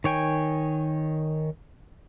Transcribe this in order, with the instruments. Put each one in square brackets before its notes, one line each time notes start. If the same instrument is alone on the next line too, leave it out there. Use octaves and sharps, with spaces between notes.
[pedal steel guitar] D#3 C#5 G5 G#5